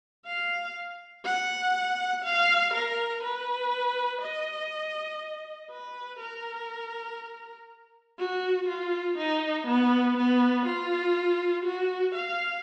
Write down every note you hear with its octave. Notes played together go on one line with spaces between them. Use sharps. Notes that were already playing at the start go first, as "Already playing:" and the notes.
F5
F#5
F5
A#4
B4
D#5
B4
A#4
F#4
F4
D#4
B3
B3
F4
F#4
F5